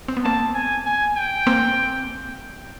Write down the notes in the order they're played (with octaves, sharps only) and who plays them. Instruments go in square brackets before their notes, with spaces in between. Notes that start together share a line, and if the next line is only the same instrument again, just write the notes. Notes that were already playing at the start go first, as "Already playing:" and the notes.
[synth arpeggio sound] C4
B3
[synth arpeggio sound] A#3 C4 [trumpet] A5
[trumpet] G#5
G#5
G5
[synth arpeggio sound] A#3 C4